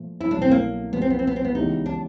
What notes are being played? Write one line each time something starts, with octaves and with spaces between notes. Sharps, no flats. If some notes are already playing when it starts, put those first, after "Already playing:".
Already playing: A#2 F3 A3
E4
C2 B2 F#3 A3 D4
C4
A#3
C2 A#2 F3 B3
C4
B3
C4
B3
C4
B3
C#2 C#3 E3 G3 B3 D#4
D4